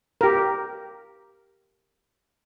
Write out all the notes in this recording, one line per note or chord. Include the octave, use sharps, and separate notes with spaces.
G4 A#4